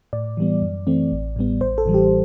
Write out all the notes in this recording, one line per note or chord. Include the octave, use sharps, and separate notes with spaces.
A2 D5
E3 G3 B3
F#2
E3 A3 C4
A1
A2 G3 B3
A1 C5
A4
A2 E3 G3
G4